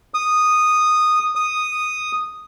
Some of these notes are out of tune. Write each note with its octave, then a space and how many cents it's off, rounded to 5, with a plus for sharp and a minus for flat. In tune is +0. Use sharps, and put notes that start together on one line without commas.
D#6 -10
D#6 -5